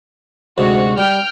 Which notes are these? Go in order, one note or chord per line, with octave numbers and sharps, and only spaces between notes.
D2 G#2 C3 F#4
G3 G5 F6 G6